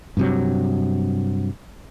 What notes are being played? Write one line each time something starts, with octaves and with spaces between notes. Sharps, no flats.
G2 C3 F#3